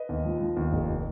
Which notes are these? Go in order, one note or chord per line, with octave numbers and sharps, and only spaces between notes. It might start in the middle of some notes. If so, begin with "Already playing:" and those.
Already playing: B4 D#5
D#2
F3
F3
D#2
F1